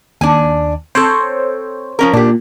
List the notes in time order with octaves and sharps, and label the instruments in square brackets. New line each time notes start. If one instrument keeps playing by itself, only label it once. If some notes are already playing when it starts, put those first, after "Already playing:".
[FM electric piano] D#2 [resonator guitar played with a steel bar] D4 G#5
[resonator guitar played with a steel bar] C4 A4 [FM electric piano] C5 C#5
[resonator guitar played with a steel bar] F3 C#4 A#4
[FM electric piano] A#2 [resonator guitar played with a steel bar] D4 G4